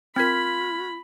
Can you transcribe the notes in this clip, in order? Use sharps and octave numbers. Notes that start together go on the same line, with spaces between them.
C4 F4 A#4 B5 F6 G#6 B6